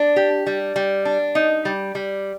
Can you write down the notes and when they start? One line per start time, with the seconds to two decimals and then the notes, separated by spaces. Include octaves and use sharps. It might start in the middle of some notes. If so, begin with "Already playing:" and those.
Already playing: D4
0.16 G4
0.47 G3
0.76 G3
1.05 D4
1.35 D#4
1.65 G3
1.95 G3